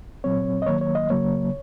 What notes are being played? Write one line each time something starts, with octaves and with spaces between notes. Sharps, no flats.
A#2 F#3 C4 C#5
D#5
D#3 F#3 A#3 C#5
C#5
D#5
C#3 F#3 A#3 C#5